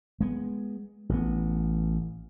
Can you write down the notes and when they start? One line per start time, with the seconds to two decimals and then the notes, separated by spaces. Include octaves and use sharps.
0.21 G#3 B3
1.09 A1 B3